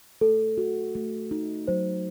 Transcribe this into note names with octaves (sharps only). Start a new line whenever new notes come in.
A3 A4
F#4
A3
D#4
F#3 C5